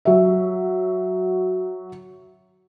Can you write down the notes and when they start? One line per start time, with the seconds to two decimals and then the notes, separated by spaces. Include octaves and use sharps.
0.05 F#3 E5